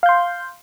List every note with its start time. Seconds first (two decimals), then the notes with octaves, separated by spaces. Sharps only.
0.03 F5
0.06 G6
0.09 C6